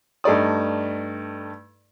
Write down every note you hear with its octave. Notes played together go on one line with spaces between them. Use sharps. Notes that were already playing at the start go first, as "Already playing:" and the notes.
G2 A3 D#4 D5 D#6